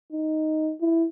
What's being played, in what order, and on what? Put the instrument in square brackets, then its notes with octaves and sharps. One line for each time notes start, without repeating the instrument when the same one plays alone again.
[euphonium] D#4
E4